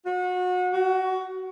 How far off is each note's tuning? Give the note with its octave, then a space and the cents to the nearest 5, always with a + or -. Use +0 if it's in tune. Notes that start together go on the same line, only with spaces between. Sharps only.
F#4 -30
F#4 +20